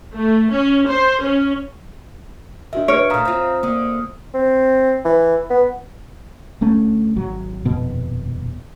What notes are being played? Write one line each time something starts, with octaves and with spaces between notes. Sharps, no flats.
A3
C#4
C5
C#4
D#3 D4 F#4 E5
B4 C#5 F6 D7
A#2 A3 F5 A#5 D#6 F6
C4 F4
D3 A#3 D#6
C4
E3
B3
D2 A3 C#4
G#1 F#3
D#1 F2 B2 B3